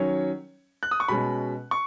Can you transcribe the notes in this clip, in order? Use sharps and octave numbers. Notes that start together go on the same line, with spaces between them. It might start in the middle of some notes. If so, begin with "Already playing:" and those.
Already playing: D#3 F#3 C#4 C#5
F#6
D#6
C#6
B2 G#3 C#4 B5
C#6